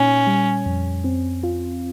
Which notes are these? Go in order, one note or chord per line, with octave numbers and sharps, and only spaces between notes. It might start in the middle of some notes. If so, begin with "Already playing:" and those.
Already playing: A#2 C#4 D#4
G3
F2
C4
F4